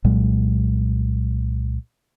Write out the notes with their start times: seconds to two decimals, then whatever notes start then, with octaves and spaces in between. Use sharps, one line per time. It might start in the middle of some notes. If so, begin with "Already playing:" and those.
0.04 C2 A#2 F#3 G#3